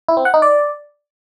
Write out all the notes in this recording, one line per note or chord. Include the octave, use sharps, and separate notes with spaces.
E4
C4
F#5
D#4
D5